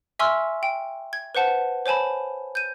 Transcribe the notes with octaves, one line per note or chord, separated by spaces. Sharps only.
E5 G#5 C6 C#6 E6 F6
G5
G#6
B4 C5 F#5 A5
C5 C#5 G#5 A5 B5
G6 D#7